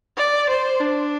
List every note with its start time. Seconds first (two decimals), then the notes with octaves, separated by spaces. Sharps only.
0.17 D5
0.50 C5
0.80 D4